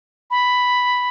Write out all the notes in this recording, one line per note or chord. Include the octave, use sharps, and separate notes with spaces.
B5